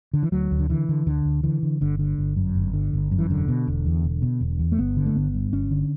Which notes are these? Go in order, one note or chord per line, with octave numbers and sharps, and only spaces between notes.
D3
E3
D2 F#3
D2
D3
D3 E3
D3
D2 D3
D2
D3 E3
D3
G1 D3
D3
G1
F#2
G1
D3
G1
F#2
E3
E1 D3
B2
E1
E2
E1
B2
E1
E2
A3
G1 B3
D3
A3
G1 B3
G2
G1 C#4
D3